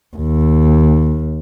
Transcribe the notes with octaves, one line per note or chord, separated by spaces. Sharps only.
D#2